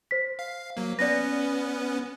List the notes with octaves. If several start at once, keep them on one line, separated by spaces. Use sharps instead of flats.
C5 B6
F5
F#3 A#3
B3 C#4 B4 D5 A#6